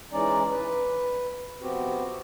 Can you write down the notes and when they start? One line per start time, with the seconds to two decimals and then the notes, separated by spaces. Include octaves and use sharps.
0.13 E3 G#3 C#4 D#4 D5
0.51 B4
1.62 C3 F3 B3 C4 F#4 G4